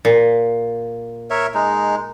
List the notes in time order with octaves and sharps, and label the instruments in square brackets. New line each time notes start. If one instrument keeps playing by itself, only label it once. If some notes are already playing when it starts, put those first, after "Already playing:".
[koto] A#2
[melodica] A#4 C#5 E5
G#3 D#4